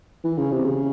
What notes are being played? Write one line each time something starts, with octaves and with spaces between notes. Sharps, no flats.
E3
C#3
C3
C#3